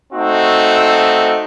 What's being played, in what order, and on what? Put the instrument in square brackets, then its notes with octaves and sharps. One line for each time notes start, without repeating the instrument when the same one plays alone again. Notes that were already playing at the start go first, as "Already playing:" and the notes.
[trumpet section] A3 C4 D#4 F#4